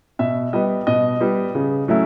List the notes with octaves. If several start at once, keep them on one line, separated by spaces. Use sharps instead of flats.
B2 E5
G3 B3 D#5
B2 D#5
G3 B3
C#3
F#3 A3 C#4 E4